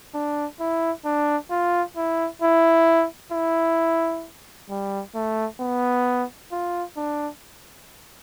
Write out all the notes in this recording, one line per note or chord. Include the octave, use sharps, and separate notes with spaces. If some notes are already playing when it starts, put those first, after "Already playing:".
D4
E4
D4
F4
E4
E4
E4
G3
A3
B3
F4
D4